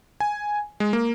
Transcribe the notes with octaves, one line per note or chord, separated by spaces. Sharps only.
G#5
G#3
A#3